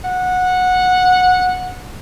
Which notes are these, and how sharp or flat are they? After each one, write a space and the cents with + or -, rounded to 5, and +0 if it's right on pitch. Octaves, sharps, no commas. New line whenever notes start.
F#5 -15